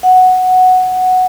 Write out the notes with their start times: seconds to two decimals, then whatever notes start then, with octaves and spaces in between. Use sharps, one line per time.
0.03 F#5